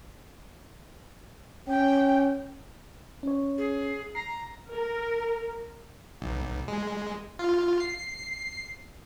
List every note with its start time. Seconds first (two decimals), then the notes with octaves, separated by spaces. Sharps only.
1.68 C#4 G5
3.23 C#4 C#5
3.58 G#4
4.15 A#5 C7
4.72 A#4
6.22 B1
6.68 G#3
7.39 F4
7.80 C7